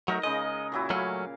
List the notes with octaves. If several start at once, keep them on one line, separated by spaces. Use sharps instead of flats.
F#3 A3 D#4 A#4 A#5
C#3 G#3 D#5
A#2 F#3 E4
F#3 A3 C#4 F5